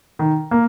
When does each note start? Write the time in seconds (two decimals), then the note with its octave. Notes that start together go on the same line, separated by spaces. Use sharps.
0.19 D#3
0.51 A#3